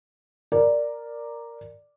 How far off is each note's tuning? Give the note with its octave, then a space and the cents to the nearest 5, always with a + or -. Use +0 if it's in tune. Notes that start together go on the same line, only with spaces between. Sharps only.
A#4 +0 D5 +0